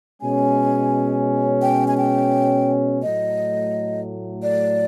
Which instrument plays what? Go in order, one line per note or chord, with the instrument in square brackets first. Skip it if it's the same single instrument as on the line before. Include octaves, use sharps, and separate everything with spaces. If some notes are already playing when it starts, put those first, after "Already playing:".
[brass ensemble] B2 G#3 C#4 [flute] G#5
[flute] G5
G#5
G5
[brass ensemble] A2 F#3 A3 [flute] D#5
[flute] D5